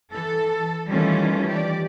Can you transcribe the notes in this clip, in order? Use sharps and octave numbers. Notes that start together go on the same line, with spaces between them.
E3 A4
D#3 E3 G3 A3 C#4 F4
G4 D5